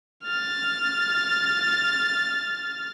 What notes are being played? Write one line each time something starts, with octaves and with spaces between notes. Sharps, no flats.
F6 A6